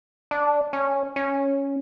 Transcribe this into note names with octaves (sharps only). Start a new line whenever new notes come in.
D4
C#4
C#4